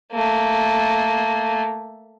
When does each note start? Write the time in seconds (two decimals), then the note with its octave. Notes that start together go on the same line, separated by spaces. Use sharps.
0.13 A3 A#3